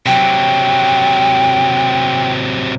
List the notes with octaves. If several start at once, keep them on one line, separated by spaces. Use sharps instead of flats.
C3 F#3 G5